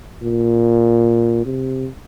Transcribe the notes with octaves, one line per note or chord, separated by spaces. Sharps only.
A#2
C3